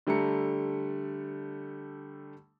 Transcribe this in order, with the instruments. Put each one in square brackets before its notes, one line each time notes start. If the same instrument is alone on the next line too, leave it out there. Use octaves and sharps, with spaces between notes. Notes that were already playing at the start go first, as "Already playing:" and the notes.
[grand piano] D3 G3 A3 A#5 C#7